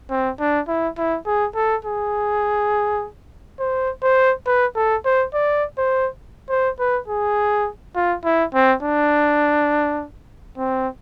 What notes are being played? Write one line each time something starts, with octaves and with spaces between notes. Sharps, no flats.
C4
D4
E4
E4
G#4
A4
G#4
C5
C5
B4
A4
C5
D5
C5
C5
B4
G#4
F4
E4
C4
D4
C4